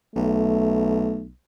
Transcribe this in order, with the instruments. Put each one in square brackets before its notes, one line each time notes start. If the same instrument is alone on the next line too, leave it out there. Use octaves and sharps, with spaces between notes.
[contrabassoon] B1 [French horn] A3